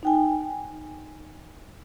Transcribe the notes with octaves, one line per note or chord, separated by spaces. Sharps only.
D#4 G5 G#5